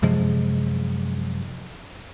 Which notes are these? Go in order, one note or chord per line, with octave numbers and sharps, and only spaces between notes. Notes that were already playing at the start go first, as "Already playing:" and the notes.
F#2 C3 F3 G#3